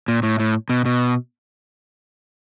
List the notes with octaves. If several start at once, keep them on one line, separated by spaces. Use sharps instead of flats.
A#2
A2
A2
B2
B2